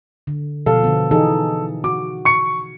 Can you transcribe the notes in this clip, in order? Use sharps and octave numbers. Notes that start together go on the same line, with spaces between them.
D3
B2 F3 A4 F5
D3 B3
E3 D#4 G#4 A4
F#4 D6
C#6 C#7